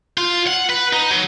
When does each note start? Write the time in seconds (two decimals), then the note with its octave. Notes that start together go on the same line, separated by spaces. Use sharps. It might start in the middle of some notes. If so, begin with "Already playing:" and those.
0.18 F4
0.47 F#5
0.70 B4
0.93 D#4
1.10 F#3